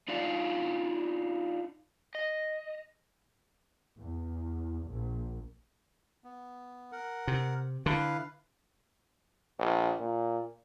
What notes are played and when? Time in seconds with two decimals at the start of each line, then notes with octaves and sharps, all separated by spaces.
0.08 D4 D#4 F4 D5 E5
2.15 D#5
3.97 E2
4.87 A#1
6.24 B3
6.92 A#4 F#5
7.27 C3
7.86 D3 E4 B4 F5
9.58 A#1
10.00 A#2